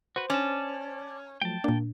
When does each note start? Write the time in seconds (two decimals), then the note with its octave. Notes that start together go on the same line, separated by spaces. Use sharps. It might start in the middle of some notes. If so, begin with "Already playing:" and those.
0.16 F#4 B4 C5
0.30 C#4 D5 A5
1.42 F3 F#3 A3 G5 A5
1.64 A#2 A#3 D4